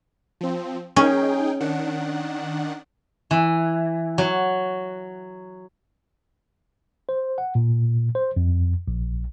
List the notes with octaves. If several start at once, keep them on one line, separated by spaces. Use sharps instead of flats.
F3 C4
C#4 D#4 G#4 G5
D#3 D4 F#5
E3
F#3
C5
F#5
A#2
C5
F2
A#1